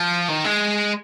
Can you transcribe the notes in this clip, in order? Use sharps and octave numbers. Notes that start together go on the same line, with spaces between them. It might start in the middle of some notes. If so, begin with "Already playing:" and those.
Already playing: F3
D#3
G#3